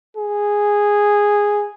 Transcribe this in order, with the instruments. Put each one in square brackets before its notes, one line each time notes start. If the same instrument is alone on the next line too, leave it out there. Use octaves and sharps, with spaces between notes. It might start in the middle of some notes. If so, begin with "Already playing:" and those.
[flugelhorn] G#4